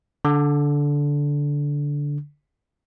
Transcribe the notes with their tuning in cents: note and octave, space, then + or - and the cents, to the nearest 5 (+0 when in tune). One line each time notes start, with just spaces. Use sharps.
D3 -15